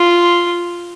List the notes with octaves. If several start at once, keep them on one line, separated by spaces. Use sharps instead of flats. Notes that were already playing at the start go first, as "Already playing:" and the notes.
Already playing: F4